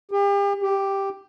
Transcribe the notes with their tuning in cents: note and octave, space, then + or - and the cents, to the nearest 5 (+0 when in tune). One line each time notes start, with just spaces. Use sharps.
G4 +40
G4 +0